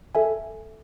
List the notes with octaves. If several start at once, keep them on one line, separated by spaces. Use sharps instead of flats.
A4 E5 G#5